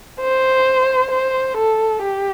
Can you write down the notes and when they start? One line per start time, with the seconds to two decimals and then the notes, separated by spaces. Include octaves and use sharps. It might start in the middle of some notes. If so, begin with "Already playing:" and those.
0.21 C5
1.11 C5
1.57 A4
2.02 G4